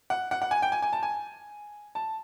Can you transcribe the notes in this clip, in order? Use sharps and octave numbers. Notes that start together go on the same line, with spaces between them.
F#5
F#5
F#5
G#5
G5
G#5
G#5
A5
G#5
A5